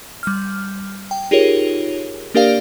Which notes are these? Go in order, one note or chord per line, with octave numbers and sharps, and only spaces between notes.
G3 F6
G5
D#4 F4 G4 G#4 A#4 C#5
A#3 D4 G4 A#4 D5 F5